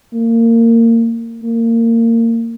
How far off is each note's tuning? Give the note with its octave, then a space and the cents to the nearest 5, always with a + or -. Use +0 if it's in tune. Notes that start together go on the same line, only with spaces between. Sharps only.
A#3 -25
A#3 -25